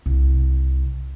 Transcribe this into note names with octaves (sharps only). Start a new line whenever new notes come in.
C2